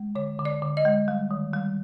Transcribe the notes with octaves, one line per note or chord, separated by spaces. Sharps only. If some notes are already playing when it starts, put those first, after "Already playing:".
Already playing: G#3
D3 C#5
D3
D5
D3
D#5
G#3
G3
D#3
G3